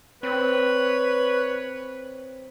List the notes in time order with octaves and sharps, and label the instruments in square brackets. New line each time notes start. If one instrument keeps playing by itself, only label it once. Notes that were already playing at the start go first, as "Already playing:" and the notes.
[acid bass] C4 [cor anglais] B4 [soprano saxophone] C#5